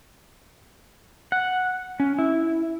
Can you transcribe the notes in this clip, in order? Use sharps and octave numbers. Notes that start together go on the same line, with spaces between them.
F#5
C#4
E4